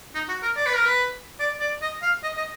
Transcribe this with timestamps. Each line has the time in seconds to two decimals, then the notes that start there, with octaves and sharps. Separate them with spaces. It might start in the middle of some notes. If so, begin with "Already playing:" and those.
0.15 D#4
0.29 F#4
0.42 A#4
0.57 D5
0.66 B4
0.75 A#4
0.85 B4
1.40 D5
1.60 D5
1.82 D#5
2.03 F5
2.23 D#5
2.37 D#5